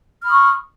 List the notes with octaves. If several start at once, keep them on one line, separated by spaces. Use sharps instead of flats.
B5 C#6 D#6 F6